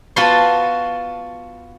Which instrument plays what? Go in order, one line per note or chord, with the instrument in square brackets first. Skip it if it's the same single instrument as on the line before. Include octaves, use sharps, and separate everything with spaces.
[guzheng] B3 F4 F#4 A5 B5 C6